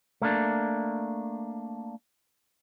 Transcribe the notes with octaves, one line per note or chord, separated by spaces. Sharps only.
A3 A#3 D4